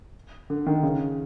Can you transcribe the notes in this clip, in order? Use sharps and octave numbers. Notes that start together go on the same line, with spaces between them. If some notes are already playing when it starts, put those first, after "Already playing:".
D3
D#3
C#3